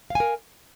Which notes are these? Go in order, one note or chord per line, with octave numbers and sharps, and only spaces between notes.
A#4 F5 G#5